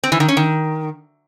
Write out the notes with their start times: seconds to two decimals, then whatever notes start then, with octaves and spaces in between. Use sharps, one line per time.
0.04 C4
0.12 E3
0.20 D#3
0.28 C#4
0.37 D#3